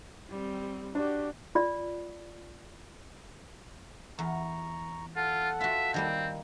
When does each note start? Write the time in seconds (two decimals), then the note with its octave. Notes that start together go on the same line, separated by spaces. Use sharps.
0.30 G3 C4
0.95 D4 F#4 G4
1.55 F4 D5
4.19 E2 A#5 C#6
5.16 F4 A4 F#5
5.61 F4 F#4 E5
5.94 D#3 G3 A#3 C4